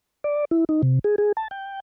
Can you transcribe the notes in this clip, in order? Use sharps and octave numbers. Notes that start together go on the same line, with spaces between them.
D5
E4
D#4
C3
G#4
G#4
A5
G5